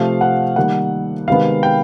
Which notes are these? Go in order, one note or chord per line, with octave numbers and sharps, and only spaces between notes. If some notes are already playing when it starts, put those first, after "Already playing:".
Already playing: C3 F3 A3 F5
F#5
D#3 G3 A#3 F#5
C3 D#3 G#3 B3 F5
G5